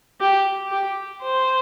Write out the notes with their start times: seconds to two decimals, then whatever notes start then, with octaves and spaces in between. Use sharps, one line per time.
0.20 G4
0.71 G4
1.22 C5